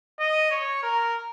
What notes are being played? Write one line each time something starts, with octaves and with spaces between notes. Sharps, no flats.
D#5
C#5
A#4